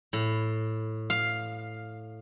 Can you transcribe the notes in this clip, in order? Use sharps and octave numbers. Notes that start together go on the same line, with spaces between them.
A2
F5